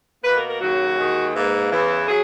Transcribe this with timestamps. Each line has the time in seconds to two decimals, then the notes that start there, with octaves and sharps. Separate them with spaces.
0.24 B2 A#3 B4
0.37 A#4
0.49 A#4
0.61 D#2 C#3 F#3 F#4
0.98 D#2 D#3 G#3
1.35 G#2 E3 A#3
1.71 E2 C#3 E3
2.08 F#3 G#4